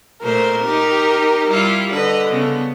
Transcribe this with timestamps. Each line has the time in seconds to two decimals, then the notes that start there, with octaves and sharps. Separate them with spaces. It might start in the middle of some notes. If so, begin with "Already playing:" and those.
0.22 A#2 A3 A#4 C5
0.64 D#4 G4
1.48 G3 E4 F4
1.93 D3 B4 D#5
2.30 C#3 B3